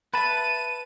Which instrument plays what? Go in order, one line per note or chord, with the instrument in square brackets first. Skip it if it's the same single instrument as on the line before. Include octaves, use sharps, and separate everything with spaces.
[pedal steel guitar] B4 A5 [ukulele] E5 B5 [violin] D#7